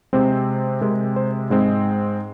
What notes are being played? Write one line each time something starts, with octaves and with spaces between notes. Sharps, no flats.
C3 G#3 C4 C5
C3 G#3 C4 A#4
C5
G#2 G#3 C4 D#5